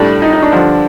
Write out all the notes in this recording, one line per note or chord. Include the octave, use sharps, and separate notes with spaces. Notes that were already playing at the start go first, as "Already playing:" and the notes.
Already playing: A2 G3 A3 D4
D#4
D#4
D4
G2 D3 F3